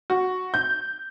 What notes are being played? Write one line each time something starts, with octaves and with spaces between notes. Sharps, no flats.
F#4
G6